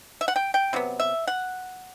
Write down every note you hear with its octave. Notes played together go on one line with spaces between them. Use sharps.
E5
F#5
G5
G5
C3 F#3 B3
E5
F#5